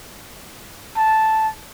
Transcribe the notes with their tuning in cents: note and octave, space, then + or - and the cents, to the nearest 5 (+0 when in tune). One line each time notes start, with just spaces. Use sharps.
A5 -5